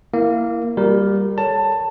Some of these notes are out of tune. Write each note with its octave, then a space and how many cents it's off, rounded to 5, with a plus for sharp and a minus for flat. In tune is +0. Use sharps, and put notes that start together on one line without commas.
A#3 +0 E4 +0 E5 +40
G3 +15 F#4 -25 A#4 +0
A4 -15 C#5 +0 A5 +15